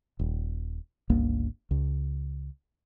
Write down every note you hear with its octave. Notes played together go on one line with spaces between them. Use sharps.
D#1
G1 C#2 A#3
C#2